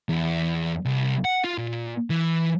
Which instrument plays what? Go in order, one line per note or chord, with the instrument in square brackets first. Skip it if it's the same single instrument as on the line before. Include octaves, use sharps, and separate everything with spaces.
[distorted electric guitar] E2
C2
F#5
F4
A#2
E3